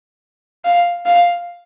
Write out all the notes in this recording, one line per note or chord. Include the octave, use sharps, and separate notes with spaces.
F5
F5